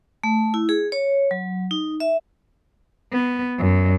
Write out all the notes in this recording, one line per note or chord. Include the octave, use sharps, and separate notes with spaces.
A3
E4
G#4
C#5
F#3
D#4
E5
B3
F#2